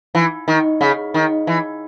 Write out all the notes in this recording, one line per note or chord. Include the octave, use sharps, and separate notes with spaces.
E3
D#3
C#3
D#3
E3